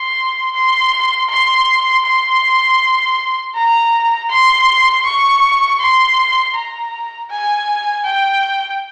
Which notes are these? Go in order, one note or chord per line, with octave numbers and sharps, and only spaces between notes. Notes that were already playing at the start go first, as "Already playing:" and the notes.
Already playing: C6
C6
C6
C6
A#5
C6
C#6
C6
A#5
G#5
G5